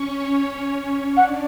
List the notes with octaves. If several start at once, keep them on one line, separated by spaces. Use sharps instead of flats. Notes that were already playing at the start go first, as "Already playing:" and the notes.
Already playing: C#4 C#5
D4 D5 F#5